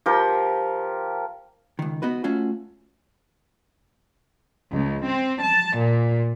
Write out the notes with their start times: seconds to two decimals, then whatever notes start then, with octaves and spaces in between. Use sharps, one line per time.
0.06 F3 G4 A#4
1.79 C#2 D#3
2.02 B3 D#4 F#4 B4
2.24 A3 C#4 F4 F#4
4.70 C#2
5.04 C4
5.40 A5
5.79 A#2